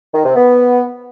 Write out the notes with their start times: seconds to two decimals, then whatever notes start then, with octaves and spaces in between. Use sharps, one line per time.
0.14 D#3
0.25 C3
0.36 B3